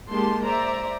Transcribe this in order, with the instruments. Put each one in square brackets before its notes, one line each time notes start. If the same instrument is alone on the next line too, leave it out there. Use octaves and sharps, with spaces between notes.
[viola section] G#3 A#3 D#4 G4 A5 C6
C5 D5 E5 A#5